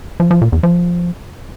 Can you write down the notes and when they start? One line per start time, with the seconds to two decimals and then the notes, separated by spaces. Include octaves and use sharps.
0.20 F3
0.31 F3
0.42 A#2
0.52 E2
0.63 F3